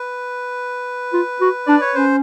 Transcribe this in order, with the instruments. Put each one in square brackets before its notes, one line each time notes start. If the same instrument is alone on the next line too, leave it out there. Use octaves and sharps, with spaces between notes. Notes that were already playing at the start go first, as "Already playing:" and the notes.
Already playing: [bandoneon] B4
[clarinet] F4
F#4
[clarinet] D4 [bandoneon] D5
[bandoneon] C#5
[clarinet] C#4 [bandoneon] C5